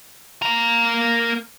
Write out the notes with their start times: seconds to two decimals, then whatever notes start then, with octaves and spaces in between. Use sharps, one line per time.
0.42 A#3 A#4